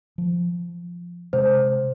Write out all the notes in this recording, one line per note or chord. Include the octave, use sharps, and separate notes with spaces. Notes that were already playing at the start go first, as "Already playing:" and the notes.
F3
C3 G#3 C5